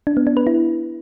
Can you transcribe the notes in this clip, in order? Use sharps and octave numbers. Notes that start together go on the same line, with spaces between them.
D4
B3
D4
B4
E4